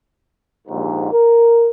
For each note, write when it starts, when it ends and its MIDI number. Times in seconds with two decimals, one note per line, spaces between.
0.68 1.08 34
0.68 1.08 39
0.68 1.08 44
1.12 1.69 70